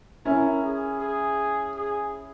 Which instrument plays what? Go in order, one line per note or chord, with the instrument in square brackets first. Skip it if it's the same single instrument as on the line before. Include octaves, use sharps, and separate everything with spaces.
[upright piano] C#4 E4 [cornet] A#4
[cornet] G#4
G#4
G#4